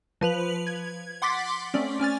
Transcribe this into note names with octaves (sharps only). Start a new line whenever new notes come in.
F3 B4 F7 F#7
G#6
F#5 C6 D6 A6 B6
A3 C4 C#4 D5
C#4 G#5 F6 A6